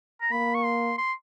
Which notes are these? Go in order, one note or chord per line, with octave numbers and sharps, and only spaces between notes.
A#5
A#3 B5
C#6
C6
C6